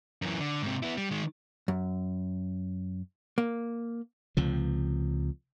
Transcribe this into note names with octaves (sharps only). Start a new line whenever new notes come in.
F#2 E3
D3
G#2 C3
B3 E4
G3
D#3 G#3
F#2
A#3
C#2 C3 F3